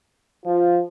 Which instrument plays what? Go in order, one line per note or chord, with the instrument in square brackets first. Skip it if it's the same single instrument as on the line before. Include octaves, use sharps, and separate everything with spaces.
[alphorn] F3 [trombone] F4